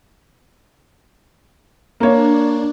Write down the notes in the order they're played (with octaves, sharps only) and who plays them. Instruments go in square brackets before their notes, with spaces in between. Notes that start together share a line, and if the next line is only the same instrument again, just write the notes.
[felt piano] A#3 C#5 [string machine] D4